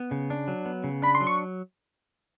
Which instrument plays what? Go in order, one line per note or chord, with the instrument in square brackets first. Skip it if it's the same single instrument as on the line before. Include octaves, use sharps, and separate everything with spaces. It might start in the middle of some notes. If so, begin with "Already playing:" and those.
Already playing: [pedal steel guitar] B3
C#3
D4
F#3
B3
C#3
[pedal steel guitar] D4 [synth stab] B5
[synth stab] C6
[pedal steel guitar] F#3
[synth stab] C#6